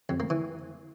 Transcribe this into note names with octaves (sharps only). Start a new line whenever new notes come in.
F2
A#3
E3